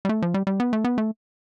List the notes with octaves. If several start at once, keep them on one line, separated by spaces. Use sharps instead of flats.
G3
A3
F3
G3
G3
B3
A3
B3
A3